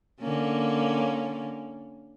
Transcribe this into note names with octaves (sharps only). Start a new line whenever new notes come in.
D3 A#3 C#4